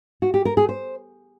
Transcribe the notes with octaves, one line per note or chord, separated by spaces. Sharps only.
F#4
G4
A#4
G#4
C5